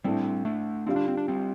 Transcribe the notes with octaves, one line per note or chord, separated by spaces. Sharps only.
A2 G3 A3 C4 D4
A3 D4
D3 G3 C4 F4
D4
C4
D4
G3 C4